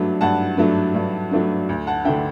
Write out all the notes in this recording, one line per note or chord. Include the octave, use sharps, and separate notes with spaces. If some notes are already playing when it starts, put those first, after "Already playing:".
Already playing: G2 F#3 A3 D4
G2 F#5 A5
F#3 A3 D4
G2
F#3 A3 D4
D2
F#5 A5
D3 A3 D4 E5 G5